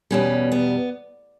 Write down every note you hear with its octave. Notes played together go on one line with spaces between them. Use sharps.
E2 B2 G3 C#4
B3